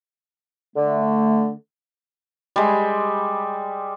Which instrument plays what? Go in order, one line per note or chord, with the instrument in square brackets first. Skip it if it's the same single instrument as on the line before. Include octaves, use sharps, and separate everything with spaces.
[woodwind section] D3 A3
[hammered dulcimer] G3 G#3